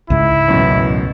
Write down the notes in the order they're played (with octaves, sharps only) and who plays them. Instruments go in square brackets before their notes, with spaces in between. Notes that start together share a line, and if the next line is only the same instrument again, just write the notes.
[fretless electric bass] C#2 G#2 [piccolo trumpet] E4
[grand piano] A1 F#2 B2